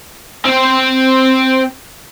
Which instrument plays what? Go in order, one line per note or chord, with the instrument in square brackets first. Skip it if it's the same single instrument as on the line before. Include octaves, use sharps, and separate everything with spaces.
[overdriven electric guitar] C4 C5